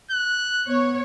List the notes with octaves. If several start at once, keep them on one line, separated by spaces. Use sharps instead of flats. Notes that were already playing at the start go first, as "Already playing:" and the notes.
F#6
B3 C#5